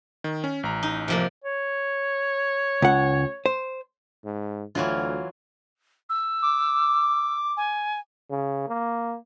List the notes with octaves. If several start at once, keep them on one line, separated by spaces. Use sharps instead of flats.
D#3
C#4
A1 A#5
D#4
C3 F3 A#3
C#5
C#2 F#5
C5
G#2
D2 E3 F#3 F4
E6
D6
G#5
C#3
A#3